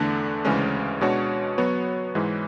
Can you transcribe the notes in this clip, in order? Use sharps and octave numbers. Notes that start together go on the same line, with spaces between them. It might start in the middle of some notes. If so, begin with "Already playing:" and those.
Already playing: E2 D3 A3 D4
D2 C#3 E3 G#3 C#4
B2 G#3 D4 F#4 C#5
F#3 B3 F#4 C#5
G#2 E3 G#3